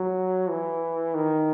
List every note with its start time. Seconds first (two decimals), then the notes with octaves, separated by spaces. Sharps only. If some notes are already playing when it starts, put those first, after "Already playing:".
Already playing: F#3
0.49 E3
1.15 D#3